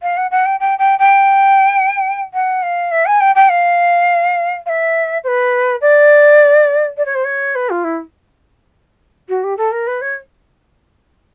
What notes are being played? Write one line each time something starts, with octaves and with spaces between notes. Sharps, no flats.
F5
F#5
F#5
G5
G5
G5
G5
F#5
F5
E5
G#5
G5
G5
F5
F5
E5
C5
B4
D5
D5
C#5
C5
C#5
B4
F4
E4
F#4
G4
A4
A#4
B4
C#5